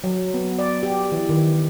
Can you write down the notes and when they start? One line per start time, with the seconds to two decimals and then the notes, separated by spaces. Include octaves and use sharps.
0.04 F#3
0.34 B3
0.59 D5
0.83 G4
1.12 E3
1.29 D#3